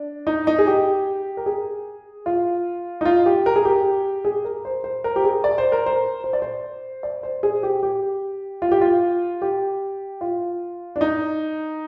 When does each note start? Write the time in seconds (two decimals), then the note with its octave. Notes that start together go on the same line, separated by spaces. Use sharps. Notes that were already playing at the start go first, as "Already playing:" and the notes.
Already playing: D4
0.27 D#4
0.47 D#4
0.59 G#4
0.67 G4
1.37 A#4
1.46 G#4
2.26 F4
3.01 D#4
3.05 F4
3.26 G4
3.46 A#4
3.56 G#4
3.65 G4
4.25 G#4
4.45 A#4
4.65 C5
4.84 C5
5.04 A#4
5.16 G4
5.24 G#4
5.44 D5
5.58 C5
5.72 A#4
5.86 C5
6.24 C5
6.33 D5
6.42 C5
7.03 D5
7.23 C5
7.43 G#4
7.63 G4
7.83 G4
8.62 F4
8.72 G4
8.81 F4
9.42 G4
10.21 F4
10.96 D4
11.01 D#4